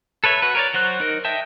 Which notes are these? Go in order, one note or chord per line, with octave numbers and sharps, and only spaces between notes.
A4 B4 C#5 E5
F#4 B4
A#4 C#5 D5
F#3 F#4 C5 F#6
D#4 A#4
D#5 E5 G5 A5